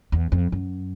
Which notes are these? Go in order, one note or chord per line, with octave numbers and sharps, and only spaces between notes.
E2
F2
F#2